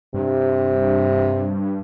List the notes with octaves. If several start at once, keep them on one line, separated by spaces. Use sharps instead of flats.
G2 C3